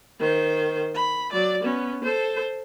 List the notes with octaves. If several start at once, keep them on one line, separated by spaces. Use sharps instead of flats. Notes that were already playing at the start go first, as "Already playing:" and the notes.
D#3 C5
B5
F#3 D5
B3 C#4
A4 C5